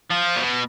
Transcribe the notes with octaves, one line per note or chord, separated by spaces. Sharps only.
F3
A#2
B2